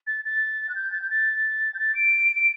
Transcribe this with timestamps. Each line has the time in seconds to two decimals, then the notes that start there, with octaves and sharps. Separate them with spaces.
0.07 A6
0.25 A6
0.69 F#6
0.75 G6
0.92 A6
1.02 G6
1.10 A6
1.74 G6
1.79 A6
1.95 D7
2.35 D7